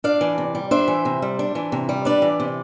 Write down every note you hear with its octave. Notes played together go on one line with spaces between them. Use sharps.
D4 D5 F5
E3
C3
G3
D4 C5 E5
E3
C3
G3
D4
E3
C3
G3
D4 B4 D5
E3
C3